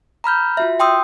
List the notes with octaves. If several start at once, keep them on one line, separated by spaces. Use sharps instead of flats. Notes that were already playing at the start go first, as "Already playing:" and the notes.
A#5 B5 F6 G6
F4 F#4 E5
G5 C6 D#6 E6 G6